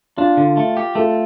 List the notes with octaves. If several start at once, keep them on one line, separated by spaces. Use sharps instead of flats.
D4 F4
D3
A3
G4
A3 F4 A4